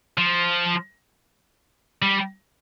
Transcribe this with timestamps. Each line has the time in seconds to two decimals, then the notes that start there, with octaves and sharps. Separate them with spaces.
0.18 F3
2.02 G3